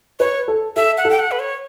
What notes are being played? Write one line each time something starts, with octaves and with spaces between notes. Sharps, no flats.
B4 C#5
A4
A4 E5
F#5
A4
G5
F#5
B4
C#5